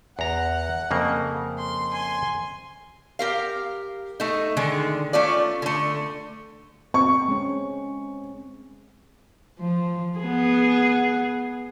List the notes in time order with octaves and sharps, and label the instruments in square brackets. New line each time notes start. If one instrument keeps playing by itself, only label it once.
[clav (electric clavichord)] E2 A#5 [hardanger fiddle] F#5
[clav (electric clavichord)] F2 C#3 A#3
[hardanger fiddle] C6
G#5 C6
[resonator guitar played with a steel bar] G4 A#4 F5
A3 D#4
D3 D#3 G#3
A3 C#4 F4 D5
D3 A3
[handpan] C4 [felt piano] C#6
[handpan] G#3 C#4
[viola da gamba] F3
B3 G#4